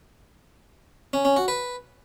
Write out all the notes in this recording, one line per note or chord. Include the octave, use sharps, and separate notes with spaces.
C#4
C#4
F#4
B4